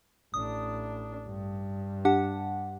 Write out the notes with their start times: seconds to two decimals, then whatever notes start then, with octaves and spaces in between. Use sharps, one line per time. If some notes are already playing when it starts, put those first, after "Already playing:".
0.34 A1 D4 D#6
1.27 G2
2.05 D4 G4 F#5